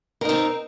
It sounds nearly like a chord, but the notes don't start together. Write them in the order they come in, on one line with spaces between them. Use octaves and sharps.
A#4 D#4 C4